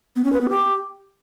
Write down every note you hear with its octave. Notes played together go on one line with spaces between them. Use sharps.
B3
C#4
B4
B3
G4